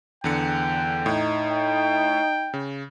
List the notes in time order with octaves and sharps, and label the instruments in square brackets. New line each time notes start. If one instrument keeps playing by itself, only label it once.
[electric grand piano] E2 D3 C#7 [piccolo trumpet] G5
[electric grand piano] A2 [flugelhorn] D#4
[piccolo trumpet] G5
[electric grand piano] C#3